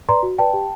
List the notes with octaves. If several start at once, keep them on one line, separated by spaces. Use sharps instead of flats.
B4 D5 A#5 C6
F#4
B4 D5 G5 A5
G4